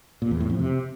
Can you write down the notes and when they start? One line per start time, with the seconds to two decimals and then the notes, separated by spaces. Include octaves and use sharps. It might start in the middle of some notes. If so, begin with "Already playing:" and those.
0.22 A#2
0.31 E2
0.40 A2
0.50 F2
0.59 C3